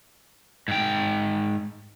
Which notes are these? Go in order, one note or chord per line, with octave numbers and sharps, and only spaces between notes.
G#2 G5